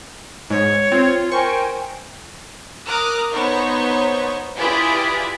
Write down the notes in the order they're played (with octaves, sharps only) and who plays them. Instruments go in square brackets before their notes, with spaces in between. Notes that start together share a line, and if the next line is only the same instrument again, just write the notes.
[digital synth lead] G#2 [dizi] C#5
[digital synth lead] C4 [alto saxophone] F4
[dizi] A#4 [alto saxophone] C5 [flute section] G5 G#5 [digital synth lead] C#6
[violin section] A#4 A#5 D6 D#6 F6 F#6
B3 D#4 C5 C#5 C#6
E4 F4 G4 G#4 B4 D5